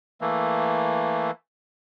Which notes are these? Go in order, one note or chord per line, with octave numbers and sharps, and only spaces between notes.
E3 A3 A#3